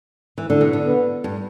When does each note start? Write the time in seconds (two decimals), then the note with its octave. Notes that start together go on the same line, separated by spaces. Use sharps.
0.38 E3
0.50 D3
0.61 B2
0.73 D3
0.86 B3
1.24 G2